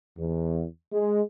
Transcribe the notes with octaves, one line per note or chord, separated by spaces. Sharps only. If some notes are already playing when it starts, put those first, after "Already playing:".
E2
G#3